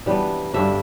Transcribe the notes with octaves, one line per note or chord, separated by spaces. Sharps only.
E3 G3 B3 D4
G2 D3 G3 D4 E5